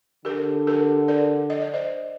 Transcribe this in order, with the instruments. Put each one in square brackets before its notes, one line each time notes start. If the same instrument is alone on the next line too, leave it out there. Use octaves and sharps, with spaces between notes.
[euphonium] D3 [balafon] G4 A#4
[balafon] G4 A#4
A#4 D5
D#5
D5
C5 D#5